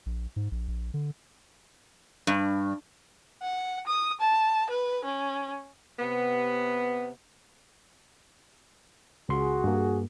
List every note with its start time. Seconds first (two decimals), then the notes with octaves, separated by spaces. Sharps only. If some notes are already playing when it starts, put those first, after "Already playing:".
0.06 A#1
0.36 G#2
0.51 A#1
0.68 A#1
0.94 D3
2.27 G2
3.42 F#5
3.87 D#6
4.21 A5
4.70 B4
5.05 C#4
5.99 C3 B3
9.29 C#2 F#4 G#4 C6
9.64 G2 A#3